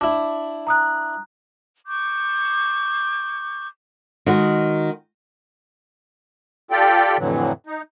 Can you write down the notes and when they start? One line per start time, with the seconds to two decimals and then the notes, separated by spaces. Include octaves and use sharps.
0.01 D4 E4
0.67 A#5 D#6 F#6
1.87 C#6 D6 G6
4.26 D#3 G#3 F#4
6.71 F4 G4 A4 D5 G5
7.18 F2 A2 D3 E3 F#3
7.67 D#4